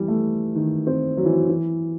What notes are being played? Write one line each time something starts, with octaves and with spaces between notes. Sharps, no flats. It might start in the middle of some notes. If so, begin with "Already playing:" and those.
Already playing: E3 G3
A3
D#3
C4
F#3
E3
F#3
E3